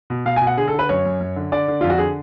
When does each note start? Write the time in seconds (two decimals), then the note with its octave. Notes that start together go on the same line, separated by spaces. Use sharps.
0.10 B2
0.25 B2 F5
0.36 G#5
0.41 B2
0.47 F#5
0.57 D3 G#4
0.68 A4
0.73 D3
0.79 B4
0.89 F#2 C#5
1.05 F#2
1.20 F#2
1.36 D3
1.52 D3 D5
1.68 D3
1.81 F2 F4
1.90 F#4
1.98 D3 G#4